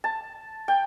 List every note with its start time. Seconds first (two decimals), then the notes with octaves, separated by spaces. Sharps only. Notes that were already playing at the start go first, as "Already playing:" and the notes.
0.04 A5
0.68 G5